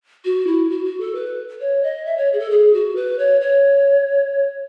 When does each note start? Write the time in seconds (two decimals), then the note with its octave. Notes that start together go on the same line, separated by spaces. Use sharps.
0.25 F#4
0.47 E4
0.70 F#4
0.85 F#4
1.00 A4
1.15 B4
1.60 C#5
1.83 D#5
2.06 E5
2.17 C#5
2.33 G#4
2.39 A4
2.51 G#4
2.74 F#4
2.96 B4
3.19 C#5
3.41 C#5